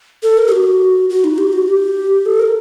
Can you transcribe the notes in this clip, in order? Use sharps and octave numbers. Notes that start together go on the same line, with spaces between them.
A4
A#4
G4
F#4
F#4
D#4
G4
F#4
G4
A4
A#4